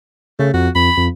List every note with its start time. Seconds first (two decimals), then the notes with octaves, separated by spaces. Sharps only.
0.39 C#3 A3
0.54 F2 F#4
0.75 F2 B5
0.97 F2